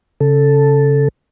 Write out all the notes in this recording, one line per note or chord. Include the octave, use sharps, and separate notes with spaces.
C#3 A4